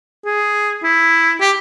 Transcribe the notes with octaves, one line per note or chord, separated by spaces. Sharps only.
G#4
E4
G4